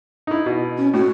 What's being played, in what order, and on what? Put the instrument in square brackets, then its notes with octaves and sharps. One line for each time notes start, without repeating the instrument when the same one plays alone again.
[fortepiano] D#4 E4
B2
[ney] C#4
[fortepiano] A2 [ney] F#4